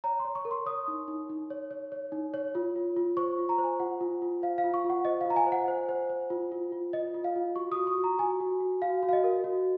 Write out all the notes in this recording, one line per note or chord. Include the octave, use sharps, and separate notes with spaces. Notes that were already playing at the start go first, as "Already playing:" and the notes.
C#5 A#5
C6
C#5
C#6
A#4
C6
C#5 D#6
D#4
D#4
D#4
C#5
C#5
C#5
D#4
C#5
F4
F4
F4
C5 C#6
F4
A#5
C5
G#5
F4 F#5
F4
F4
C5 F5
F5
F4
C#6
F4
F#5
C5 D#5
F5
F4 A#5
G#5
C5
F#5
C5
C5
C5
F4
F4
F4
F4 D#5
F4
F5
F4
F#4 C#6
D#6
F#4
C#6
F#4
A#5
F#4 G#5
F#4
F#4
F#4 F5
F#4
F5
D#5
A#4
F#4